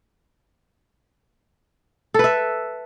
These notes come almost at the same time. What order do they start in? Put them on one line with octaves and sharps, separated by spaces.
A4 B4 E5